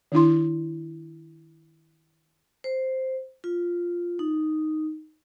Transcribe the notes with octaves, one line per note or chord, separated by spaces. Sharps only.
D#3 D4 E4 C6
C5
F4
D#4